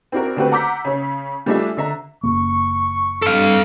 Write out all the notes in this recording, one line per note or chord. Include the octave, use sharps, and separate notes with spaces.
C4 D4 E4 F#4 A#4
D3 A3 C4 F#4 G4 B4
F#5 A#5 D6 E6 G6 B6
C#3 C#4
G3 A3 D4 F4 G#4 E5
D3 E5 A#5
F#1 F#2 A#3 C#6
G2 A4 F5